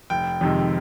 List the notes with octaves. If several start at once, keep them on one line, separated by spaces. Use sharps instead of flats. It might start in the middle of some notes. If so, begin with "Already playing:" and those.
F1 G5
F2 C3 D#3 G#3